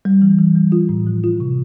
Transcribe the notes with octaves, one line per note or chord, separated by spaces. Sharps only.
G3
E3
E3
G3
F4
A2
F3
F4
C3